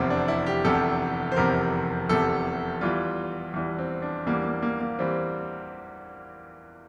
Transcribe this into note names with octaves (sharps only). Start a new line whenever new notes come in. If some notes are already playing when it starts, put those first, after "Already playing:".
Already playing: F1 E2 C3 C4
D4
E4
G4
F1 E2 C3 A4
C5
F1 E2 C3 A#4
F1 E2 C3 A4
E2 E3 G3 F4
E2 E3 G3
C4
D4
E2 E3 G3 A#3
A#3
A#3
A#3
E3 G3 C4